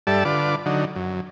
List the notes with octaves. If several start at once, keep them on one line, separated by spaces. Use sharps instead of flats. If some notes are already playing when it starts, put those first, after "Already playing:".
G2 G3 A4 D5 E5 A5
D3 F4 B4 D6
D3 F#3 D#4
F#2